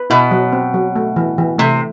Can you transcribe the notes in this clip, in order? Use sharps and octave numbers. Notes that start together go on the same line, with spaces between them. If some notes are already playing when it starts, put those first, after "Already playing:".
Already playing: B4
B2 E4
F#3
C4
F#3
A3
E3
E3
C3 A3